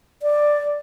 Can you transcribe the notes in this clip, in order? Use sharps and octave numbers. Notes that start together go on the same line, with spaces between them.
D5